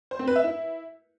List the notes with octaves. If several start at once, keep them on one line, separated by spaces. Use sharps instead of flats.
C5
C4
B4
E5
E4